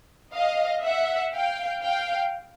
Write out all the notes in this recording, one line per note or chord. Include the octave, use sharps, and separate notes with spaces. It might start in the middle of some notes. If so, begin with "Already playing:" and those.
D#5 F5
E5 F#5
F5 G5
F5 G5